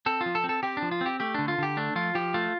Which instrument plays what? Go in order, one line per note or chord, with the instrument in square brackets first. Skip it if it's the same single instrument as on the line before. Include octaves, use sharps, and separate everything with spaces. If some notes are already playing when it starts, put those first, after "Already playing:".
[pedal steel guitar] C4 A4
F4
F3
A4
C4
A4
C4 G4
D4
F3
F4
C4 G4
A3 G4
D3 D4
F4
D3 G4
A3 D4
F3 F4
F3 G4
A3 F4